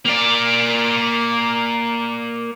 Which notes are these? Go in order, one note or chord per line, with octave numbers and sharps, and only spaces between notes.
A#3 D5